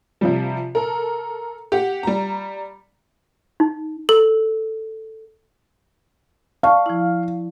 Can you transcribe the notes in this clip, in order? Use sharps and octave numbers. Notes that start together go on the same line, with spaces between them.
C3 F3 G3
A4 A#4
G4 F#5
G3 A#5
D#4
A4
D5 F5 A5 C#6
F3 E4